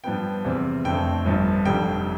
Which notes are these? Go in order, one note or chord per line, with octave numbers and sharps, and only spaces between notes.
G2 F3 B3 G5
E2 C3 G3 C4
F2 D3 A3 C4 G5
G1 G2 F3
F1 F2 D3 G3 G5